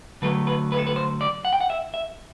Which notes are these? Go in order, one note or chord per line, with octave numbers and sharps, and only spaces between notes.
D3 F#3 A3 B4
B4
B4
A4
B4
C5
D5
F#5
G5
F#5
E5
E5